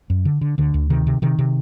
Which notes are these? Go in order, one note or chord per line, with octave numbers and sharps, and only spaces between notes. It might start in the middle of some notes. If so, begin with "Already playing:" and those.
F#2
D3
D3
D2 D3
D2
C3 D#3
C3
C3 D#3
C3